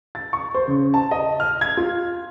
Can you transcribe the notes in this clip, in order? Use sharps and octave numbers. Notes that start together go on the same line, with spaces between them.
A6
C#6
C5
C#3
A5
D#5
F6
G#6
F4